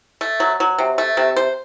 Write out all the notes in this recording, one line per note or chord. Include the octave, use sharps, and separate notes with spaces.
A3
F#3
F#3
C3
A3
C3
C5